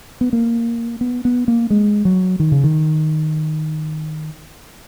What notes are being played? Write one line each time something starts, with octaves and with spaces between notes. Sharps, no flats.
B3
A#3
B3
B3
A#3
G#3
F#3
D#3
C#3
D#3